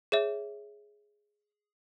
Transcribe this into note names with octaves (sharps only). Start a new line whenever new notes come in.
G#4 C#5 E5